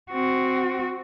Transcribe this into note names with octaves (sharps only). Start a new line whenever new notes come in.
C4 F#4